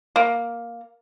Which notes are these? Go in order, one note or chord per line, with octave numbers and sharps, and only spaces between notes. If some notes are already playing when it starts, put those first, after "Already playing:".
A#3